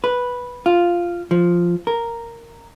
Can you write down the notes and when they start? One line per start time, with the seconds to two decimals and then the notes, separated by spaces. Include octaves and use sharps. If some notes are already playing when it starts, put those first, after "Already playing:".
0.04 B4
0.66 F4
1.31 F3
1.87 A#4